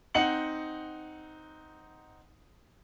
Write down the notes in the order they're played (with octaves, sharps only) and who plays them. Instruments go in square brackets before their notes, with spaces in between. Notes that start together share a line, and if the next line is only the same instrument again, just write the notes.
[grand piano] C4 D#4 F#5 C#7 F#7